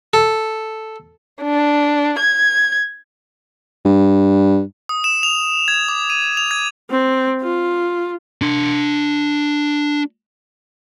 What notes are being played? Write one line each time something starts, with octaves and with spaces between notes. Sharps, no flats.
A4
D4
G#6
G2
D#6
E7
F7
G#6
D6
D#7
F7
G#6
C4
F4
D4 C6